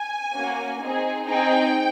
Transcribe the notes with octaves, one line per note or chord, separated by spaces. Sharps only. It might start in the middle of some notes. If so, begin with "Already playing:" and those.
Already playing: G#5
A#3 C#4 F#4
C4 D#4 G#4
C4 D#4 G#4 G5